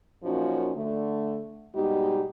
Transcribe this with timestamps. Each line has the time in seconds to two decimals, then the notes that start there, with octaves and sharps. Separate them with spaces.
0.23 F#2 A#2 F3 C#4 D#4 F#4
0.76 D3 A3
1.75 G#2 B2 G3 G#3 D#4 G4